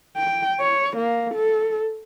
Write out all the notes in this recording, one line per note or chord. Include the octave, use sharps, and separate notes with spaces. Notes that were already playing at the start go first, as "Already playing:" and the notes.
G5
C#5
A#3
A4